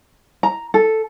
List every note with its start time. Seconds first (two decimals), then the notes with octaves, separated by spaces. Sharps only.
0.43 A#5
0.74 A4